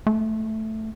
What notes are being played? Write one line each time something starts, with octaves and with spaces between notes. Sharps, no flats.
A3